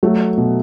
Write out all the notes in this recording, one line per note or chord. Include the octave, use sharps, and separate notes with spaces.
F#3 A3
B2